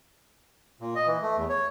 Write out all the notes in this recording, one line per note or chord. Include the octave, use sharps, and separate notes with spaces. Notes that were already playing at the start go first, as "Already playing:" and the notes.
A#2
D#5
E3
A3
E2
C#5